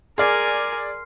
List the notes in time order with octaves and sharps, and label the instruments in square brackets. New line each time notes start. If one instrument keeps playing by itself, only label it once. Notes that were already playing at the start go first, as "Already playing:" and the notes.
[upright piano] G#4 D5 [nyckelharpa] A#4 G#5 [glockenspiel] C6 F6 C7